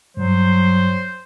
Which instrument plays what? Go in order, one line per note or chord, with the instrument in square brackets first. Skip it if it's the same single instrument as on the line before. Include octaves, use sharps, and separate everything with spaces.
[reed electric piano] G2 [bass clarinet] F#3 [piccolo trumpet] C5